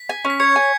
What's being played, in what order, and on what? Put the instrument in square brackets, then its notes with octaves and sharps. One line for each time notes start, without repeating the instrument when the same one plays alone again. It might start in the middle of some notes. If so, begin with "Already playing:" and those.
Already playing: [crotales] B6
[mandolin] G#5
C#4
[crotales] B6
[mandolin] C#5 [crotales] G#6 C#7
[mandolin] G#5